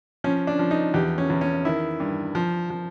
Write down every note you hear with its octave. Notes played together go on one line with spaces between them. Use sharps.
F3 C#4
D4
F3
D#4
E2 G4
C#4
E2
C#4
D#3 E4
G2
F3
F3